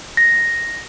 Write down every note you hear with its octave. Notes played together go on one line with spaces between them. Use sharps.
A#6